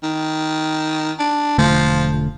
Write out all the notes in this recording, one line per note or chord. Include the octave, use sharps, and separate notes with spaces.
D#3
D4
E1 D3 F3 A3